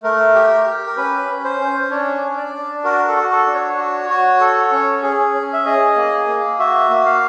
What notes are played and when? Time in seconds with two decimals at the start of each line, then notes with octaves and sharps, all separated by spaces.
0.03 A3 A#4
0.35 G4
0.66 G4
0.87 A#4
0.97 C#4 B4
1.29 C#4
1.44 C5
1.60 C#4
1.91 D4 C#5
2.22 D4
2.37 D5
2.53 D4
2.84 F#4 A#4
3.08 A4
3.16 F#4
3.31 A4
3.47 D4
3.54 C#5
3.78 F#4
4.09 F#4
4.40 A4
4.72 C#4
5.03 G#4
5.34 C#4
5.53 E5
5.65 G#4 D#5
5.96 A#3
6.27 A#3
6.59 F#4 E5
6.90 A#3
7.06 F5